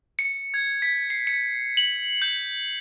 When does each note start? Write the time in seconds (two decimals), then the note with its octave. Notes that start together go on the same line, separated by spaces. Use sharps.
0.19 C#7
0.54 G#6
0.82 B6
1.10 C7
1.27 C#7
1.77 F#7
2.22 G6